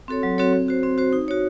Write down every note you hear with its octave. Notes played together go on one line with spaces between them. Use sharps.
C4 F#4 A4 C#5
F#3
C4 F#4 A4 C#5
C4
F#4 C5
C4
F#4 C5
D#4
F#4 C#5